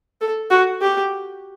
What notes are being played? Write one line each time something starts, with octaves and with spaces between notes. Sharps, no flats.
A4
F#4
G4